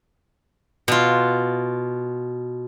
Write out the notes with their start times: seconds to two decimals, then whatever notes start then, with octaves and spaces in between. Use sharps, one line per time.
0.88 B2 F4